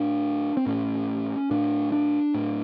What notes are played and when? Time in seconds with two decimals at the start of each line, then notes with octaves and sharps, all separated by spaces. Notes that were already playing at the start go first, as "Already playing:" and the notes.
Already playing: A2 D4
0.57 C4
0.66 A2 C#4
1.51 A2 D4
1.92 D4
2.34 A2